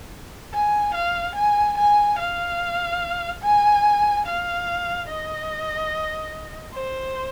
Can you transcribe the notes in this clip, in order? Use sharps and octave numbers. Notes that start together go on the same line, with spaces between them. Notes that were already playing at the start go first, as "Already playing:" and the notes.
G#5
F5
G#5
G#5
F5
G#5
F5
D#5
C5